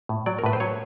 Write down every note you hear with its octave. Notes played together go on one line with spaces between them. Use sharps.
A2
F#3 D5
A#4
A2 B4
C5
F#3 C#5